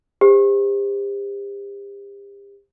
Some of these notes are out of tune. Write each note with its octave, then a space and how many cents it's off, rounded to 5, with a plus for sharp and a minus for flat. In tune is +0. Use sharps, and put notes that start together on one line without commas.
G4 +35 C5 +0